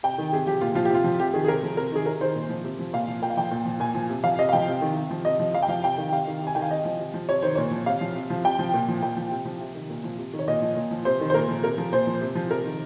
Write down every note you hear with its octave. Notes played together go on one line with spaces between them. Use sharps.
C3 G5
D#3
C3 G#4
F3 G4
A#2 F4
F3 F4
G4
C3 F4
F3
C3 G4
D#3 G#4
G#4
C3 A#4
F3
C3 A#4
D#3 G#4
C3 A#4
D#3 C5
A#2
F3
C3
F3
A#2 F5
F3
A#2 G5
F5
F3 G5
A#2
F3
A#2 G#5
F3
C3
F3 F5
C3 D#5
F5
F3 G5
C3
D#3
C3
F3
C3 D#5
F3
C3 F5
G5
F3 F5
C3 G5
D#3
C3 F5
D#3
C3
G#5
D#3 G5
F5
C3 D#5
F3
C3
F3
C3 C#5
D#3 C5
A#2 C#5
F3
C3 F5
F3
C3
F3
C3 G5
F3
A#2
F3
A#2 G5
F3
C3
F3
C3
D#3
A#2
F3
C3
D#3
C#5
A#2 D#5
F3
A#2
F3
C3 C5
D#3
C5
A#2 A#4
F3
C3 A#4
F3
A#2 C5
F3
C3
F3
C3 A#4
D#3